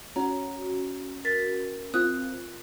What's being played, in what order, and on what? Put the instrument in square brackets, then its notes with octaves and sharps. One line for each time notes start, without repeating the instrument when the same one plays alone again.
[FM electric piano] C#4 F#4 [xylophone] C#5 A#5
[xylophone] A#4 A6 B6
[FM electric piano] C4 F4 [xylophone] D#6 F#6